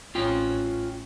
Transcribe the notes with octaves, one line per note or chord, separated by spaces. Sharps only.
A1 C#4 F4 G5